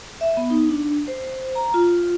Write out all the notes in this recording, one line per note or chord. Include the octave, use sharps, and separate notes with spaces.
E5
B3
D#4
D4
C5
A#5
F4